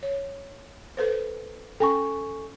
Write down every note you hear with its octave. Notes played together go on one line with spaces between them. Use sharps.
C#5
A4 B4 C5
C#4 A4 G5 G#5 C#6